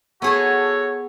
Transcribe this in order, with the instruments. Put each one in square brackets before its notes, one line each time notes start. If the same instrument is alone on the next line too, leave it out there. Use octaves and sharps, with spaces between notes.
[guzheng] B3 G#4 A5 [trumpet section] F#4 A4 C#5